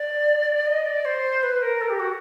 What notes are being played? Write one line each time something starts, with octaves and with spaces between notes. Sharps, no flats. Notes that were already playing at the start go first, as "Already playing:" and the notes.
Already playing: D5
D#5
D5
C5
B4
A#4
A4
G4
F#4